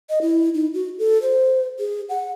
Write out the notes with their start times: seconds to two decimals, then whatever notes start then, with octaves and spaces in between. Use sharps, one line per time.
0.10 D#5
0.22 E4
0.54 D#4
0.74 F#4
0.99 A4
1.22 C5
1.79 G#4
2.09 F#5